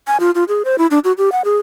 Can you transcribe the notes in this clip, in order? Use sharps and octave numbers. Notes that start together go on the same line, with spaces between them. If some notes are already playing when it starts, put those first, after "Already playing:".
G#5
F4
F4
G#4
C5
E4
D4
F#4
G4
F#5
G#4